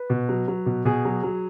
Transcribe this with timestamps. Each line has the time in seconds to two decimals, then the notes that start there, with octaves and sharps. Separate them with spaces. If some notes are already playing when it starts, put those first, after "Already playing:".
Already playing: B4
0.10 B2
0.29 F#3
0.48 F#3
0.66 B2
0.85 B2 G#4
1.05 F#3
1.23 F#3